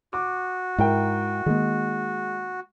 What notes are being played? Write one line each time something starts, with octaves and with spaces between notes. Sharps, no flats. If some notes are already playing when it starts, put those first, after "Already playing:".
F#4 D6
G#2 E4 A#4 G5
D#3 G#3 A#3